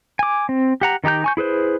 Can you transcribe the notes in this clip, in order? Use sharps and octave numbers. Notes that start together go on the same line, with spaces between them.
G#5 D6
C4
G4 F#5 A#5
D#3 D#4 G4 A#5 G6
G#5 C#6 G6
E4 G#4 B4 C5